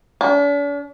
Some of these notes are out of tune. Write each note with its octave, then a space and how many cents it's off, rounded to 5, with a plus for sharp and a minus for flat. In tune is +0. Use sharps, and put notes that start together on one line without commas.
D4 -45